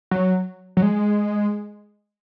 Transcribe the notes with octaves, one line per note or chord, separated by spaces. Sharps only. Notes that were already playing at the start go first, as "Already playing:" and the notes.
F#3
F#3
G#3